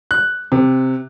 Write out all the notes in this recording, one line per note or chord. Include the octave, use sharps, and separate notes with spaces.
F#6
C3